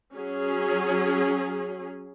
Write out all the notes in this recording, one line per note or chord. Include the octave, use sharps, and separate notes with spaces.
F#3 C#4 G#4